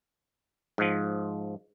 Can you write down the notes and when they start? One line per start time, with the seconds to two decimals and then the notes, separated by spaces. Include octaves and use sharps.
0.78 G#2 F3